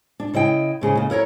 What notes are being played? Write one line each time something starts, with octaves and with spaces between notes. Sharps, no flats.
D4
C#3 E4 D#5 G5
G#2 C#3 G#4
D#2 C#3
E4 A#4 C#5 A#5